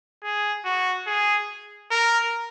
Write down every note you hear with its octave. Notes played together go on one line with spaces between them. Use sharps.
G#4
F#4
G#4
A#4